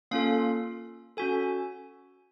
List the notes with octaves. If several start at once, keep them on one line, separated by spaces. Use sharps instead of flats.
A#3 C#4 F4 A4 F5
C#4 F#4 A4 G#5